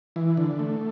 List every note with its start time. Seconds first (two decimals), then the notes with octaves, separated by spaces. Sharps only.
0.16 E3
0.37 D3
0.59 A3